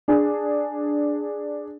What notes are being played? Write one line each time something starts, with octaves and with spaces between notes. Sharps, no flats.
D4 G#4